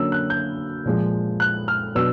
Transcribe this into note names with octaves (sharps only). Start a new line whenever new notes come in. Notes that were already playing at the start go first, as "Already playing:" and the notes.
Already playing: D3 F#3 A#3 C#4 E6
F#6
G6
A#2 F3 G#3
F#6
F6
B2 F#3 B3 D4 E6